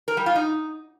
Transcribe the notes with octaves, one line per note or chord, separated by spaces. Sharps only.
A#4
G3
F4
D#4